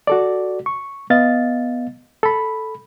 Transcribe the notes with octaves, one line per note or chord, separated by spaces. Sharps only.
F#4 A4 D5
C#6
B3 D#5 F5 A6
A4 B5